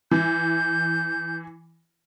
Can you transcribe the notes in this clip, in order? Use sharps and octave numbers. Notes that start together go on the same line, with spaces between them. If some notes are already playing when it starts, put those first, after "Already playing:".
E3 G6